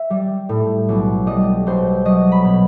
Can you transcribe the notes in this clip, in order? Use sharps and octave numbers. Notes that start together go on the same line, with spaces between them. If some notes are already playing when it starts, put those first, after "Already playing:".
Already playing: E5
G3
A2
B1
G3 D#5
B1 C5
F#3 D#5
B5
B2